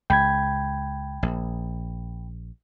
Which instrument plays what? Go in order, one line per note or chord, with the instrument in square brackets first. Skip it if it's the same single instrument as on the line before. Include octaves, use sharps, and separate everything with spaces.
[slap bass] C#2 [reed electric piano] G5 B5 G#6
[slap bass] A#1